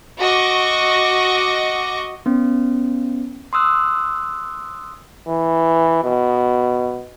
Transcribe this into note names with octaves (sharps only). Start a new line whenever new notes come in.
F#4 D#5 C#6 D6
B3 C#4
C6 D#6 E6 F#6
E3
B2